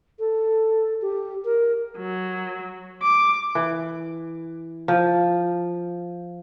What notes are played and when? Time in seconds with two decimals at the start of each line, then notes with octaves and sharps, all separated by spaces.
0.19 A4
1.02 G4
1.45 A#4
1.98 F#3
3.02 D6
3.55 E3
4.88 F3